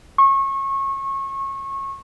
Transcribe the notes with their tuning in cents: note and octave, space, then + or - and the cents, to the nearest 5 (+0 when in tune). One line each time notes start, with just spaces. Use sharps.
C#6 -25